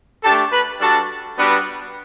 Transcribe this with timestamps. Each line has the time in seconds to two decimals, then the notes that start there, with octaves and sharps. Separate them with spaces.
0.23 A3 D4 G4 A4 A5
0.52 B4 B5
0.80 G3 D4 F#4 A4 A5
1.37 G3 B3 D4 F#4 B4